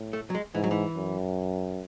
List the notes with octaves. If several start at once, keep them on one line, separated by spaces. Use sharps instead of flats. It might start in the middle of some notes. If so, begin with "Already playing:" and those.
Already playing: A2
A3
F#3
G#3
G#2 E3
F#3
E3
F#2